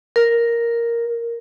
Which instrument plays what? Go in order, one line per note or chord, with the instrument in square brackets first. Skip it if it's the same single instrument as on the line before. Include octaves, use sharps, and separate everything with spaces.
[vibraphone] A#4